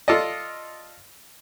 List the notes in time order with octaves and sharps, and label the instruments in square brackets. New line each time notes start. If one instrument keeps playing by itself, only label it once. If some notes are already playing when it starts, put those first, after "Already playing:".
[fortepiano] F4 A4 D5 D#5